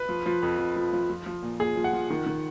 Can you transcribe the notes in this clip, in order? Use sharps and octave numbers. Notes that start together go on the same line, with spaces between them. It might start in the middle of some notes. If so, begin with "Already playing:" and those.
Already playing: B4
F3
F3
F2
F2
F3
F3
F3
F3
A#2
A#2 G#4
F3
F#5
F3
D#3
D#3